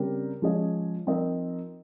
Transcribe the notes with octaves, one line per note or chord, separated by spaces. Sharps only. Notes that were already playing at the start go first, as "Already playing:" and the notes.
Already playing: C#3 G3 C4 G4 A#4
F3 G#3 C#4 G#4 D#5
F3 C4 D#4 A#4 D#5